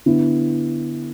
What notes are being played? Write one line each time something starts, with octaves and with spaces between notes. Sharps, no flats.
D3 B3 E4